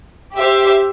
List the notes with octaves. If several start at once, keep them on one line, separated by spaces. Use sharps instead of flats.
G4 C5 E5